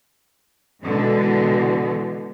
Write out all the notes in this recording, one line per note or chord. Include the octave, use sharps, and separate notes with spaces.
B2 D3 E3 G#3